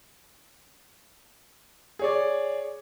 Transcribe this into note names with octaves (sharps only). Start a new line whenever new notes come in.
G#4 C#5 D5